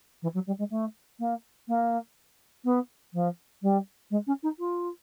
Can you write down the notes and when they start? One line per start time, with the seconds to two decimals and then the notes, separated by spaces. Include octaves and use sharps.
0.22 E3
0.34 F#3
0.47 G3
0.58 G#3
0.70 A3
1.19 A#3
1.68 A#3
2.64 B3
3.13 F3
3.62 G3
4.10 G#3
4.27 C#4
4.43 D#4
4.59 F4